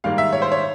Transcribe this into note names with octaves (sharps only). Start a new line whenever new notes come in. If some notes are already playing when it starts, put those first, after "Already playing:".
G#2 D#3 G3 A#3 F5
E5
C#5
C5
C#5